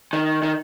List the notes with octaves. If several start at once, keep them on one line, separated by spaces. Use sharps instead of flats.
D#3
D#3